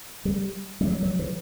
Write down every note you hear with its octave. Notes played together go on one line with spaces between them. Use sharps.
G3
G3
F#3
F#3
E3